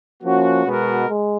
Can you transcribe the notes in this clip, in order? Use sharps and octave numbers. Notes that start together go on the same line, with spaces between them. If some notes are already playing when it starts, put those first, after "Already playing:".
F3 A#3 C#4 F#4
B2 G#3 B3 F#4 A#4
G#3